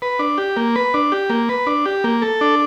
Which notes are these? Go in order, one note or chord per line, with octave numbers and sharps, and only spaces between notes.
B4
D4
G4
A#3
B4
D4
G4
A#3
B4
D4
G4
A#3
A4
D4